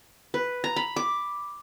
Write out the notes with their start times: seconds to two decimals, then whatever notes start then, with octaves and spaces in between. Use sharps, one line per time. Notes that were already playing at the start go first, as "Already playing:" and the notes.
0.34 B4
0.64 A#5
0.76 B5
0.96 D6